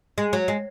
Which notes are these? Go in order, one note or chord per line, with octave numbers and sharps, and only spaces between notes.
G#3
F#3
G#3